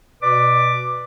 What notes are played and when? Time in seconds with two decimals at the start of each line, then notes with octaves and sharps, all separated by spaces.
0.22 B2 B4 D5 D6